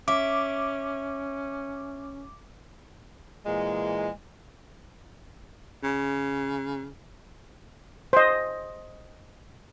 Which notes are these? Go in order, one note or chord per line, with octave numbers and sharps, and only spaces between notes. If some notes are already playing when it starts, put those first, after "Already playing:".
C#4 E5 D6
A#2 E3 G#3
C#3
C5 D#5